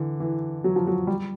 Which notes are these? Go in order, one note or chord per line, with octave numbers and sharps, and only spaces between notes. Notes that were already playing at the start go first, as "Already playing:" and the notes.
Already playing: D3 E3
E3
F#3
F3
F#3
G3